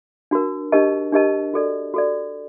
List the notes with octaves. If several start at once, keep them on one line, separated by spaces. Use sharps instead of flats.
D4 F#4 A#4
D4 G4 A#4 D#5 A5
D4 G4 A#4 D#5 A5
F#4 A4 D5
F#4 A4 D5